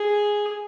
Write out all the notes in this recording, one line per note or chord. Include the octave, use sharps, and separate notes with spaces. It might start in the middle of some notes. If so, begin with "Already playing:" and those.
Already playing: G#4